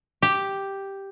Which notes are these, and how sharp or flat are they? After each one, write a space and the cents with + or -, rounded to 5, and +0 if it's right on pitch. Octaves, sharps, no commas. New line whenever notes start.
G4 +0